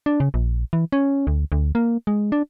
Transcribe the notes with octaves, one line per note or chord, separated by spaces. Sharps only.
D4
C#3
A#1
E3
C#4
D2
D2
A#3
G#3
D4